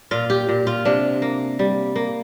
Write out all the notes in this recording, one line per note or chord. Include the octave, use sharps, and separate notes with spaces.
A#2 F4
G4
A#2
F4
C3 D4
A#3
G3
A#3